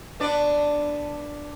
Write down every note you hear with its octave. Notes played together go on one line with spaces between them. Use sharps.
B3 D4 D5